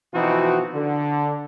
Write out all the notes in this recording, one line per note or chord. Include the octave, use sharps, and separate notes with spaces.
B2 E3 F3 C4 D#4 F#4
D3